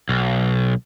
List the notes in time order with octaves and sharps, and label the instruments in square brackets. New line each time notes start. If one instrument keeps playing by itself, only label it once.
[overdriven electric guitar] B1